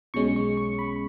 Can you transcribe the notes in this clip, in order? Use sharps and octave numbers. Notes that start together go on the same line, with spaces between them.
B1 B2 G#3 C#4 C#6
C#6
C#6
B5